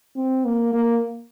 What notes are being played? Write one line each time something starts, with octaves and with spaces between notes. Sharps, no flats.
C4
A#3
A#3